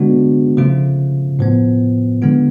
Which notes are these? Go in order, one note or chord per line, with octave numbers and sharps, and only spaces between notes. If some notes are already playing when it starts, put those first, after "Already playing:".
Already playing: D3 G#3 B3 D4 F#4
C#3 F3 A3 F4
A2 F3 B3
D3 G#3 B3 F4